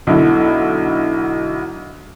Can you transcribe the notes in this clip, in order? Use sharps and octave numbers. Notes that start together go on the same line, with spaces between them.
B1 D3 E4